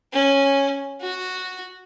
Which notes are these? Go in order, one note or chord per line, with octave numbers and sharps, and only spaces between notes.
C#4
F#4